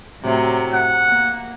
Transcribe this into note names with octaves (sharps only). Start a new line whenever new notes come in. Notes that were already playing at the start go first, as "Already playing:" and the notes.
A2 C3 F#3
F#5
A#3